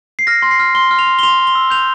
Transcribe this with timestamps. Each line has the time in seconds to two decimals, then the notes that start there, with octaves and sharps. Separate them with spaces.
0.19 C7
0.27 F6 A#6
0.42 C6
0.51 C7
0.60 F6
0.75 C6 G7
0.91 F6
0.99 F7
1.07 C6
1.19 G7
1.23 C6 F7
1.39 C6
1.47 G7
1.55 E6
1.70 G6 F7